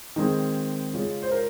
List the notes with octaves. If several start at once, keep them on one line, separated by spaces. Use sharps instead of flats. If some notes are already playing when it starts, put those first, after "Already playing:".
D#3 G#3 C4
C#3 G#3 C#4 F4
C5
A#4